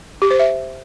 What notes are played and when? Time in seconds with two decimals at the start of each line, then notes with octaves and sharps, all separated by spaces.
0.22 G4
0.31 C5
0.39 E5